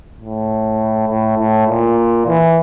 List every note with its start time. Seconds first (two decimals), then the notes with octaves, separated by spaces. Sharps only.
0.21 A2
1.09 A2
1.38 A2
1.68 A#2
2.27 E3